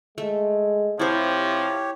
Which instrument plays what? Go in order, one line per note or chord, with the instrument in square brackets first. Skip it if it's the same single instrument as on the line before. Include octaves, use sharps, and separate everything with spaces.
[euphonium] G#3 [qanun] A3
[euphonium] C3 [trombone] F3 [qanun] E4 C5 [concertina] G4 C#5